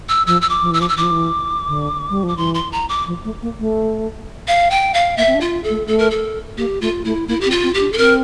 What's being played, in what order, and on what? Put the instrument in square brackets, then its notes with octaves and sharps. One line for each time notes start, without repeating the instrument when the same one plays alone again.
[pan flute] E6
[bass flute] F3 [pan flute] E6
[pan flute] E6
D6
[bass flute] F3
[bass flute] E3 [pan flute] E6
[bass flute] F3 [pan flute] D6
[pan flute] E6
[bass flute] E3 [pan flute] D6
[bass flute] F3
E3
D3
G3
F3
[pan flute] D6
[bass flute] E3 [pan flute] C6
[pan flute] C6
A#5
D6
[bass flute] F3
A3
A#3
A3
[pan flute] F5
G5
F5
[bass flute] A#3 [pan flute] E5
[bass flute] C4
D4
[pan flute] F4
A4
[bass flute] A3
[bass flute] A3 [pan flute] A4
[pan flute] A#4
A4
[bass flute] A#3 [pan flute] G4
[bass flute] A3 [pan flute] F4
[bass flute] A3 [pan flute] E4
[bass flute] A#3 [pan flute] E4
[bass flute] C4 [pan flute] G4
[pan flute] F4
[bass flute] C4
[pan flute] G4
[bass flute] D4
[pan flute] A4
[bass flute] C4 [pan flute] A#4